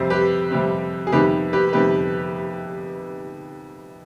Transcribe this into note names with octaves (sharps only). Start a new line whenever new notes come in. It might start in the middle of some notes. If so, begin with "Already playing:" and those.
Already playing: F2 C3 G3 C4
G4 B4
F2 C3 G3 C4
G#4
F2 C3 D#3 G3 B3 G4 B4
G4 B4
F2 C3 D#3 G3 B3 G4 B4